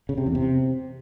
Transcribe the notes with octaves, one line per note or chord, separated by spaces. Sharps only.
C#3
C3
E2
C3